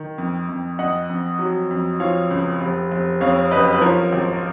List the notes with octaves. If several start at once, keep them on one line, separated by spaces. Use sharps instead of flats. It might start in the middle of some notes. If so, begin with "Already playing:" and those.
Already playing: D#3
F2
F2
F2 D#5 F#5
F2
F#3
F2
F3 C#5 F5
C#2
F1
F1
F2 C#5 F5
F#1 B4 D#5
B4
F3 A#4 C#5
G#1